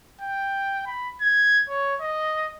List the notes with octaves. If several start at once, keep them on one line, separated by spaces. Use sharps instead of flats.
G5
B5
G#6
C#5
D#5